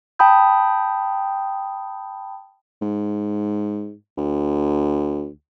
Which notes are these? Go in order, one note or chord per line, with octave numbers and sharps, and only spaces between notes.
G5 A5 B5 D#6 G6
G#2
D2